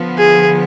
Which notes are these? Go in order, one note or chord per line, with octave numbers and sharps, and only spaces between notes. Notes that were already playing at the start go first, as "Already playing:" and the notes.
Already playing: D3 F3 B3
G#4